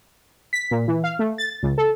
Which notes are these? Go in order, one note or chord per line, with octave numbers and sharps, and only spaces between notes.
B6
A#2
E3
F5
A3
A6
C#2
A4